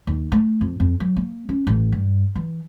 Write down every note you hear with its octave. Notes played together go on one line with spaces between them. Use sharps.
D#2
A3
F2
F2
F#3
A#3
C#4
A1
G2
E3